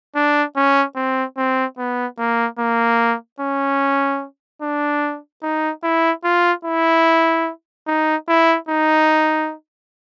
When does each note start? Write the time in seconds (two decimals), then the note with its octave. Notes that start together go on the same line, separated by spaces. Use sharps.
0.15 D4
0.56 C#4
0.96 C4
1.37 C4
1.78 B3
2.19 A#3
2.59 A#3
3.40 C#4
4.62 D4
5.43 D#4
5.83 E4
6.24 F4
6.65 E4
7.87 D#4
8.28 E4
8.69 D#4